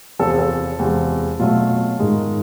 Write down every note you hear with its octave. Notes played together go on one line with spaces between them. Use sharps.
E2 C3 F3 A4
G#4
A4
E2 C3 F3 G#3
B2 F#3 A3 F4
G#2 D#3 G#3